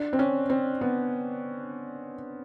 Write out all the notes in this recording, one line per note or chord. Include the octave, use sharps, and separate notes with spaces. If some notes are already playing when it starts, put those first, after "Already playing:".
Already playing: D4
C4
C#4
C4
B3